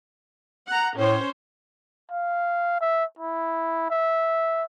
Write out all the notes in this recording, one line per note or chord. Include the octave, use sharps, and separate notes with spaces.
F#5 A#5
A2 C#4 C5 C#5
F5
E5
E4
E5